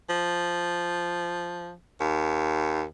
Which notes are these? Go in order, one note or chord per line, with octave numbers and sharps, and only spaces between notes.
F3
D#2